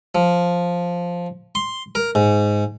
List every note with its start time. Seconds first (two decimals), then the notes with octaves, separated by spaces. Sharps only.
0.15 F3
1.55 C6
1.95 A#4
2.15 G#2